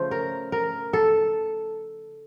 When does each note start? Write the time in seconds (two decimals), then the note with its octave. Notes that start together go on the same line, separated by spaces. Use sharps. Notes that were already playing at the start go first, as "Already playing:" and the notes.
Already playing: C#3 F3 A3 C5
0.11 A#4
0.52 A#4
0.93 A4